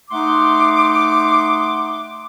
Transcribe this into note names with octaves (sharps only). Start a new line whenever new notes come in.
A3 D#4 F#5 C6 D6